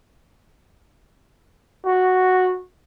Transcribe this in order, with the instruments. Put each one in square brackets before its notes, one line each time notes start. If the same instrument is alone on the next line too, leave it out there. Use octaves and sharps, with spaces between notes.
[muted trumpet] F#4